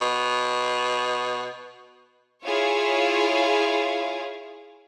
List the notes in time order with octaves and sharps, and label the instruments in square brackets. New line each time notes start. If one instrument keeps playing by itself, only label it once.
[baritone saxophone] B2
[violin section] E4 F4 G#4 C#5 F5